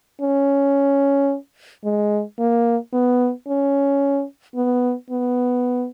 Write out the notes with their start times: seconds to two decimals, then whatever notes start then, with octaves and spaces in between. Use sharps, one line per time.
0.21 C#4
1.84 G#3
2.39 A#3
2.93 B3
3.48 C#4
4.55 B3
5.10 B3